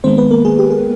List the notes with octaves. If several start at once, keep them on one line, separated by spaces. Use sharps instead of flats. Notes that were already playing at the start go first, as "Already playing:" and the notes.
D#3 G#3 B3 C4 C5
B3 B4
A#3 A#4
G#3 G#4
G4
G#4